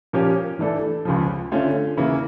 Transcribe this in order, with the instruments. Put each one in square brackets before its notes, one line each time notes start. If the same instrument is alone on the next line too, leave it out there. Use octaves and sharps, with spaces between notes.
[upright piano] A#2 F3 A#3 C#4 G4
E3 A3 D4 A4
C#2 C#3 F3
D3 A3 C#4 F4
C#3 E3 A#3 E4